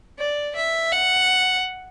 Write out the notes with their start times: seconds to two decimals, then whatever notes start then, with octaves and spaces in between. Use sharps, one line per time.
0.19 D5
0.56 E5
0.92 F#5